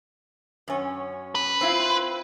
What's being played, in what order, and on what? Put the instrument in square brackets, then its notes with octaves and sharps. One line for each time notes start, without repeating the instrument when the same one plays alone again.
[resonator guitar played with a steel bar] F#2 C#4
[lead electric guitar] B4
[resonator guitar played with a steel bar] C4 E4 F4